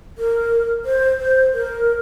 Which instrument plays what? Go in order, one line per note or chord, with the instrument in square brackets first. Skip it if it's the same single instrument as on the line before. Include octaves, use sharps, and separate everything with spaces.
[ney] A#4
C5
C5
A#4